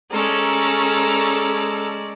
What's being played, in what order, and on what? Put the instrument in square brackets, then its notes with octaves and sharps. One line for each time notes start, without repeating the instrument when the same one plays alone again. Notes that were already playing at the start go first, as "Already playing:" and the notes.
[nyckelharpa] G#3 D5 [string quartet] C#4 A4 A#4